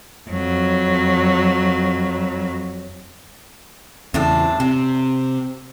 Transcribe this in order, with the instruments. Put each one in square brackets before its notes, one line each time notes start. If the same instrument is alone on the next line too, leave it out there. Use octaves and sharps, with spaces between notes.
[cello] F2 F#3
[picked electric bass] E2 C#3 [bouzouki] A2 C4 D4
[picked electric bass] C3 [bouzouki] C4